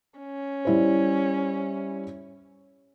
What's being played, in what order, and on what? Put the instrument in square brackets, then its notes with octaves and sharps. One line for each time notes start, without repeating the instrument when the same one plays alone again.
[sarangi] C#4
[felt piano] G3 E4 C5